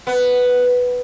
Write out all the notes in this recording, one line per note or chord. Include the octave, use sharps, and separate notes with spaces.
B3